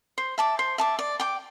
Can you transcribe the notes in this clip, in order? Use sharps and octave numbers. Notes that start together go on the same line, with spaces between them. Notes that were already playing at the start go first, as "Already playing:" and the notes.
C5
E5 A5 D6
C5
E5 A5 D6
D5
G5 D6